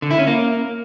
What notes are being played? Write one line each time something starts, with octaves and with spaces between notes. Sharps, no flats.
D3
E4
C#4
A#3